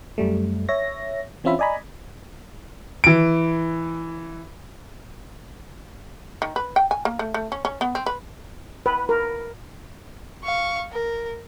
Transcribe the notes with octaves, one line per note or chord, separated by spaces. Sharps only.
F#2 G3 A3
C#5 E5 A#6
E3 C4 C#4 F4 E5 B5
D5 D#5 G#5 A#5 B5
E3 D7
D#3
B4
G5
G#5
A#3
A3
A3
C#4
C#4
B3
C4
B4
B4
A#4
F5 C#6
A#4